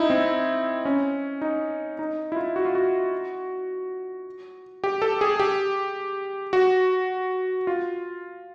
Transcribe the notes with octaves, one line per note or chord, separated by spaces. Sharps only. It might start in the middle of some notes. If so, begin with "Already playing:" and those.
Already playing: D#4 E4
C4
C#4
D#4
D#4
E4
F4
F#4
F4
F#4
G4
A4
G#4
G4
F#4
F4